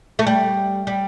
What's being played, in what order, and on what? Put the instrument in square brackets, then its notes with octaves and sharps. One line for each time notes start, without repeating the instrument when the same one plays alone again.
[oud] A3
G3
G3